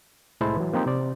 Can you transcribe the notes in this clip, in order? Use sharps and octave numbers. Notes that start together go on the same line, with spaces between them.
C2 A2 G#3 E4 C5 A5
E3 F#3
F3 A#3 C4 D#4 G4
C3 C5 D5